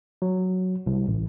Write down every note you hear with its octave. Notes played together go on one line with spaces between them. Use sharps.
F#3
C2
A1